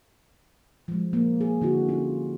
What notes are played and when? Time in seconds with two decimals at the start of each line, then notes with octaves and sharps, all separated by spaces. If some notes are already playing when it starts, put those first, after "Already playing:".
0.88 F3 G#3
1.13 A#3
1.41 G#4
1.61 D3 E4 F#4
1.89 C#4 F4